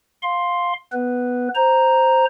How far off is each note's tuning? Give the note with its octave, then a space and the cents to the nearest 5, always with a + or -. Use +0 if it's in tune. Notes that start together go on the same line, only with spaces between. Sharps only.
F5 +10 C6 +5
B3 +0 B4 +0
C5 +0 A#5 +0